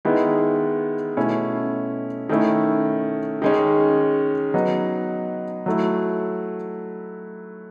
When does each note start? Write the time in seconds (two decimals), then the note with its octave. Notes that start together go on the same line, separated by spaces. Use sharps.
0.05 D#3 G#3 B3 E4
1.17 B2 A3 C#4 E4
2.29 D#3 A3 C#4 E4
3.42 D#3 G#3 C#4
4.54 F#3 B3 D#4
5.66 F#3 A3 E4